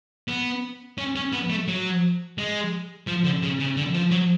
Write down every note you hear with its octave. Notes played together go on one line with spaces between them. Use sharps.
B3
C#4
C#4
B3
A3
F#3
G#3
F3
D3
C#3
C#3
D3
F3
F#3